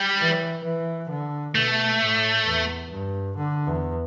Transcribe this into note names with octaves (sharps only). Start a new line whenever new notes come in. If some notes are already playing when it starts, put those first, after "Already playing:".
Already playing: G3
E3
E3
D3
B2 A3
A2
E2
G2
D3
E2